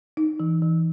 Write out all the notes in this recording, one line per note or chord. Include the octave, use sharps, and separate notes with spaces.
D#4
E3
E3